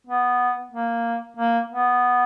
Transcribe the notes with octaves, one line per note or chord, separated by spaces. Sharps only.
B3
A#3
A#3
B3